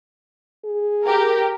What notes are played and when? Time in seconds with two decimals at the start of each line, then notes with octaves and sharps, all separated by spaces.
0.65 G#4
1.03 G4 A#4